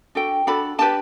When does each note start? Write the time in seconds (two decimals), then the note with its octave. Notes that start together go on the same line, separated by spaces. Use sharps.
0.15 D4 F#4 A4 G5
0.47 D4 F#4 A4 B5
0.79 D4 G4 B4 A5